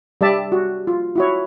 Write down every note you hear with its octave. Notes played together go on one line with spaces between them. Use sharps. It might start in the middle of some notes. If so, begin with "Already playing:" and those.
G3 G4 D5 E5 A5
F#4
F4
E4 F#4 C#5